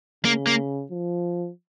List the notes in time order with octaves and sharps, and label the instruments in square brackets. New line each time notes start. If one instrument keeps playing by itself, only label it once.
[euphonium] C#3 [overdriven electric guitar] A#3
[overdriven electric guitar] A#3
[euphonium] F3